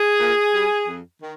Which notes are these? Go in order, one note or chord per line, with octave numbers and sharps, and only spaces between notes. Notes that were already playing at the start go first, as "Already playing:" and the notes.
Already playing: G#4
A#2
G3
F2
D#3